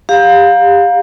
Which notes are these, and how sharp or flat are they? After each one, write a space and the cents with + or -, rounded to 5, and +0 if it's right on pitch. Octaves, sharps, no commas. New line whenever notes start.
G4 +25 F5 +20 A#5 +20